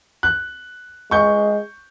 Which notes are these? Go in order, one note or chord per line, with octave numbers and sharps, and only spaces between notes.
F#6
G#3 C#6 G6